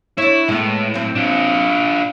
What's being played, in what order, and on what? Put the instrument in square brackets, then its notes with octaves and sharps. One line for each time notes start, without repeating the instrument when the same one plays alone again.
[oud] D4 C#5 [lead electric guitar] E4
[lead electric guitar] A2 [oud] G#3 B3
[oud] F#3 C4
[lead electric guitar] D4 F4